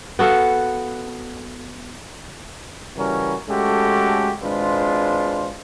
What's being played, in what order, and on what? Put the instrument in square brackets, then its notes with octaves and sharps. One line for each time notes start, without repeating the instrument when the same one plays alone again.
[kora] B3 F#4 A4 F5
[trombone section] C#3 E3 G3 C#4 F#4 A#4
G#3 A3 C#4 F#4 G4 A4
G#1 G#3 D4 F4 B4 C5